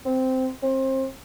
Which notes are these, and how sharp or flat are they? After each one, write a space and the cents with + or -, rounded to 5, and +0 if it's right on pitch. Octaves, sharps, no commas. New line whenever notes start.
C4 -10
C4 +25